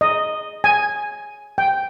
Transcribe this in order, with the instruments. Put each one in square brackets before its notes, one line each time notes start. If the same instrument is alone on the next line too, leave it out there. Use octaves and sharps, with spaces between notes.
[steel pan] D#5
G#5
G5